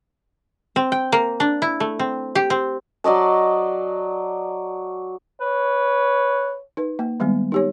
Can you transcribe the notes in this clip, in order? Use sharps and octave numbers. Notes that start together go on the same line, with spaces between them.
C4
G5
A#3
D4
E4
A3
C4
G4
C4
F#3 D5 D#5 A5
B4 C#5
D#4 B4
A#3
D#3 G3 G#3 B3
D#4 G4 C#5